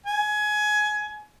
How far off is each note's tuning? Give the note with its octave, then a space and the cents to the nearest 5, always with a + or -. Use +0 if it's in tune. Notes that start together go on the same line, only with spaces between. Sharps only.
G#5 +20